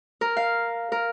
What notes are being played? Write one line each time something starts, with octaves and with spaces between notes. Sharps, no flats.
A#4
F5
A#4